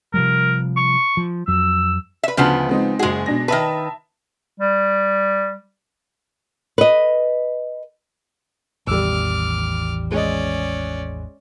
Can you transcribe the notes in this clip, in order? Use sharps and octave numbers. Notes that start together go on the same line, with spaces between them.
C3 F3 G3 A#4
C#6
F3
F2 F#3 E6
B4 E5
D2 C#3 F3 B3
G#3 C4 D#4
F#1 G#3 F#4 G#4
B2 D4 A#6
D#3 B4 E5 A5
G3
B4 D#5
A1 E2 D#3 G3 D6 E6 F6
G#3 C#4 D5 D#5